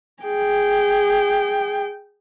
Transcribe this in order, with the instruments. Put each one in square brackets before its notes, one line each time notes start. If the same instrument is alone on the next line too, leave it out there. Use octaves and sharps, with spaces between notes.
[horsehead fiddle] G#4 G5